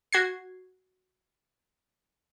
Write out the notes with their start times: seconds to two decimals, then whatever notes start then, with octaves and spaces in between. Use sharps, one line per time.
0.13 F#4 G#6 C7